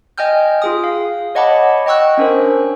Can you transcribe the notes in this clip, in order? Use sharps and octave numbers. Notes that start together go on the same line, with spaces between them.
D#5 G5 G#5 F6 G6
F4 G#4 D#6
F5
C#5 D#5 F#5 A5 B5 D6
D#5 G5 C#6 E6 F#6
C#4 D4 A#4 C5